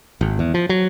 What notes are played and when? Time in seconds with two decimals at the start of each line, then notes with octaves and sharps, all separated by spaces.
0.21 G#1
0.39 E2
0.54 F3
0.69 F#3